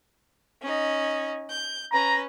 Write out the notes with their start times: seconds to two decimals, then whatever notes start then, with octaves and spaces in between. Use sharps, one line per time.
0.62 C#4 D#4
1.50 G6
1.93 C#4 B4 A#5